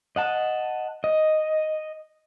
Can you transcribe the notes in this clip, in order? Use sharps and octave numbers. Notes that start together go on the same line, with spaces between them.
D#5 F#5 A5
D#5